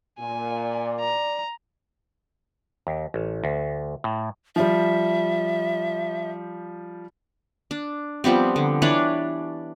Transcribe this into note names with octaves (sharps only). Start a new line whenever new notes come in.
A#2 G#5
D5
A#5
D#2
A1
D2
A2
F3 G3 E5
D4
F3 G3 B3 C4
D3
E3 D4 B4 C#5